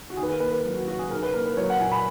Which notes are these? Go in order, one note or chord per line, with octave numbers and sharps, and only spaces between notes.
F#4
D#2 G#4
B4
A#4
A#3 B4
B4
F#3 A#4
F#4
C#3 F#4
G#4
B1 A#4
B4
A#3 A#4
B4
F#3 C#5
F#5
A#2 G#5
B5